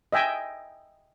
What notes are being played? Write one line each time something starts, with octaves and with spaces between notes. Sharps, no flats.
D#5 E5 G5 G#5